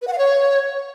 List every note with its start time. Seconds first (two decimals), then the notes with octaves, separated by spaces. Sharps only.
0.02 B4
0.07 F#5
0.13 F5
0.18 C#5